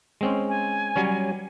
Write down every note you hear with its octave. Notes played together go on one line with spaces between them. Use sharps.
G#3 C4 C#4
G#5
F#3 G3 C#4